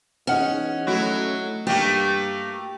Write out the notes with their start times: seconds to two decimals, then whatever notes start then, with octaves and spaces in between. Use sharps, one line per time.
0.27 E2 C#4 D#4 F#5 F6
0.87 F#3 A3 E4 F#4
1.67 G2 A3 A#3 G4